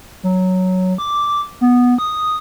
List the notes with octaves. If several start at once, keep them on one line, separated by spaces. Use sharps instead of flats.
F#3
D6
B3
D#6